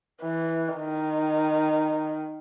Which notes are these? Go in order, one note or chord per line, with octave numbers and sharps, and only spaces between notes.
E3
D#3